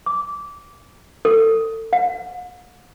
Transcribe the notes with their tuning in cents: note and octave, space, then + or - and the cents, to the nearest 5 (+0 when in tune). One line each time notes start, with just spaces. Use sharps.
D6 -20
A4 +30
F#5 -45